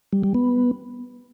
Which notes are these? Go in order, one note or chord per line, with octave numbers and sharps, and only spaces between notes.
G3
G3
B3